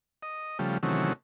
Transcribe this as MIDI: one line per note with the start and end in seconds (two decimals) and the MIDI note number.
0.23 0.58 75
0.59 0.78 49
0.59 0.78 53
0.59 0.78 55
0.59 0.78 57
0.83 1.13 48
0.83 1.13 51
0.83 1.13 52
0.83 1.13 54
0.83 1.13 57
0.83 1.13 61